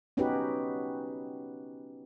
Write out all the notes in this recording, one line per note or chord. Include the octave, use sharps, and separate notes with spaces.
B3 C#4 D#4 F#4 G4 B4